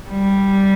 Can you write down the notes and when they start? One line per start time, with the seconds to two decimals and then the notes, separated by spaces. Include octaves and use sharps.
0.10 G3